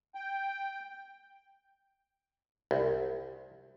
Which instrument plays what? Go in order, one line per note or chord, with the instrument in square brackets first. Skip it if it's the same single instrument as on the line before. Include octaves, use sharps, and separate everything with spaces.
[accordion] G5
[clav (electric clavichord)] C2